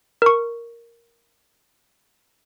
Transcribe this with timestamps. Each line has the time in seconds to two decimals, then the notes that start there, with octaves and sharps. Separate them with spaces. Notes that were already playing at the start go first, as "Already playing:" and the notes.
0.22 A#4 C#6